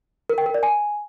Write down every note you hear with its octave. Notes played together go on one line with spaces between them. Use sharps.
A#4
G5
A#4
D5
G#5